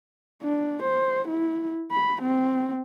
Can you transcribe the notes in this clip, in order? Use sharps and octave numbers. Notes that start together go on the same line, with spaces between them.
D4
C5
E4
B5
C4